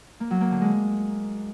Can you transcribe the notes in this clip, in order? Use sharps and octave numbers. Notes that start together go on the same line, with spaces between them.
A#3
F#3
A#3
D3
G#3